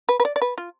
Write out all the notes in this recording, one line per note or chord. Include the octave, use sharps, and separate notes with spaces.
B4
B4
D5
D5
B4
F4